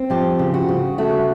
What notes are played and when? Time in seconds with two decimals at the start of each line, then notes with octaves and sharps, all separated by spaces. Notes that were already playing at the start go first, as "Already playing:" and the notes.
Already playing: C4
0.10 F3 G4
0.39 C#3
0.54 F#4
0.69 C#3
0.98 A3 F#4